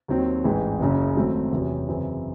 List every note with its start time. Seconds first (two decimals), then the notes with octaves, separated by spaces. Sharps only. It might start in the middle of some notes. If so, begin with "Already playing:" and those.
0.08 D#2 D#3 F#3 C4
0.44 A1 G#2 E3 G#3
0.80 F#1 F#2 C#3
1.16 G#1 G#2 F#3 A3 C4
1.52 E2 C3 F#3 C#4
1.88 F#2 C#3 E3 C4